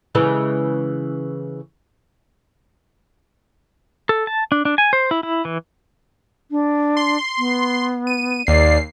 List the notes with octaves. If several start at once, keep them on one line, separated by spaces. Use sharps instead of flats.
C#3 E3 G#3
A4
A5
D4
D4
G#5
C5
E4
E4
E3
D4
C6
B3
D#7
D#2 D5 C7